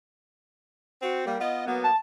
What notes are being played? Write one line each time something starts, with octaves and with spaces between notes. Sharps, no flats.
C4 F#4
G3 A#3
B3 F4 D#5
F#3 A#3 B3
A5